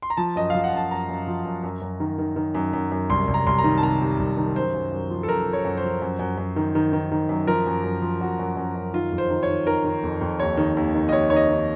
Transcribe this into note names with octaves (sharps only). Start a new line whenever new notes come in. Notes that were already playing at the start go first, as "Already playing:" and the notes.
C6
A#5
F3 A5
F#2 D#5
F3 F5
F#5
F#2 A5
F#2 A#5
F#2
F3
F#2
F#2
F#2
D#3
D#3
D#3
F#2
F#2
F#2
C2 C6
C2
A#5
C2 C6
A#5
D#3
A5
C3 A#5
C3
C2
D#3
F#2 C5
F#2
F#2
F3
A4
F#2 A#4
F3
C#5
F#2
C5
F3
F#2
F#2
F#2
D#3
D#3
D#3
D#3
F#2
F3 A#4
F#2
F#2
F3
F#2 F#4
F#2
F#2
F#2
D#3 F4
F2
C5
D#3
C#5
D#3
D#3 A#4
D#3
F2
F2
D#2 C#5
D#3
D#2
D#3
D#5
D#2 C#5
D#3 C#5
D#5
D#3